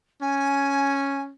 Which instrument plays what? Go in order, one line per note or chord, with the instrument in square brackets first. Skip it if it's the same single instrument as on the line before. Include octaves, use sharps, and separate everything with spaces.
[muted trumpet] C#4 [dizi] G#5